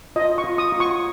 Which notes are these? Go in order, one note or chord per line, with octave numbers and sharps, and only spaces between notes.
F4 D#5
C#6
F4
D#6
F4
C#6